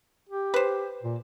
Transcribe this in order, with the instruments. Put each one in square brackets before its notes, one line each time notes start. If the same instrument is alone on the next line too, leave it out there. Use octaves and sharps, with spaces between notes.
[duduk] G4
[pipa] B4 C5
[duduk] A#2